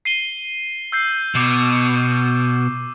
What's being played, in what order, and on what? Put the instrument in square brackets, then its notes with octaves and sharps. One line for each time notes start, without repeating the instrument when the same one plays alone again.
[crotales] C7 D#7 G7
E6 G6 C7
[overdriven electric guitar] B2 [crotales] D6 C7